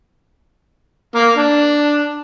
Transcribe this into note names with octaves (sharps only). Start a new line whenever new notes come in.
A#3
D4